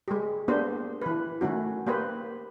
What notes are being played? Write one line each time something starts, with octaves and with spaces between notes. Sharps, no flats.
G#3 G4
A#3 B3 D4 G4 C5
E3 B4
D#3 A3 C#4 F#4
A#3 G4 B4 C5